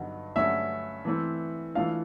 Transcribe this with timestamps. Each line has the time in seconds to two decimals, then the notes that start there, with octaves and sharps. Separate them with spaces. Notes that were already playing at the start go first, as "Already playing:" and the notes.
Already playing: G2 D3 F#3 B3 D#4
0.36 G2 D3 F#3 A3 C#4 E5
1.05 E3 A3 C4
1.74 E3 A3 D4 F4 F5